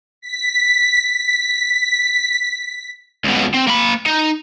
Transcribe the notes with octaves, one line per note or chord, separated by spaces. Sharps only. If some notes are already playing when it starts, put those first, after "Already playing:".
B6
B6
C#2 B2
C4
A#3 B5
D#4